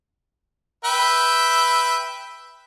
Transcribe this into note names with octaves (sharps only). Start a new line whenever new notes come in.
B4 E5 G5